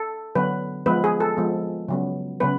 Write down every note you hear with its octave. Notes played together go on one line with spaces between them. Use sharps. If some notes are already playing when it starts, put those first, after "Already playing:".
Already playing: A4
D3 F#3 B3 B4
F3 G#3 B3 B4
G#4
A4
F3 G#3 B3
C#3 F#3 B3
C#3 F#3 B3 B4